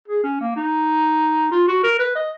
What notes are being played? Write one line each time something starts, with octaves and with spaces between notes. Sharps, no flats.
G#4
C#4
A#3
D#4
F4
F#4
A#4
B4
D#5